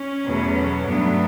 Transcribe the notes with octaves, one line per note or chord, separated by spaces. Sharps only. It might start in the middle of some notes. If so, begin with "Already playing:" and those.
Already playing: C#4
E2 B2 F#3 A3
G2 F#3 A3 B3 D4